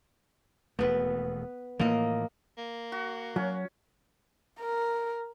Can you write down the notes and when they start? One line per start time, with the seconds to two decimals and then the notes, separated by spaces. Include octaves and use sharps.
0.79 E1 D#2 A3 B3 B4
1.80 A2 E3 F3 A#3 D#5
2.57 A#3
2.92 F#4
3.36 F#3 C#4
4.60 A#4